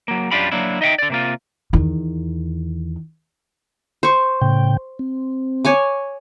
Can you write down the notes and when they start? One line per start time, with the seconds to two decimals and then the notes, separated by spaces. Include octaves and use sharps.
0.08 F#3 A#3
0.31 F#2 G3 D4 F4 G4 B5
0.52 F#3 A#3 D4 E4
0.81 D#4 D#5 E5 F#5 G5
0.99 D3 D5
1.10 C3 A#3 F4
1.73 E2 D#3
4.03 C5 C#6
4.41 A2 C#3 G5
4.99 C4
5.65 C#5 G#5 D6